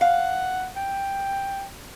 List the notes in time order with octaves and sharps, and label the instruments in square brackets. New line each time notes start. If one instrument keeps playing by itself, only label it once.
[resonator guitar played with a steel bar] F5 [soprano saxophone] F#5
[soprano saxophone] G5